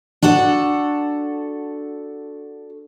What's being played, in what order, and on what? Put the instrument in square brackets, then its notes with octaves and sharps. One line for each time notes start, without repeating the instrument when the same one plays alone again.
[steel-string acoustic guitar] D4 F#4 A4 F#5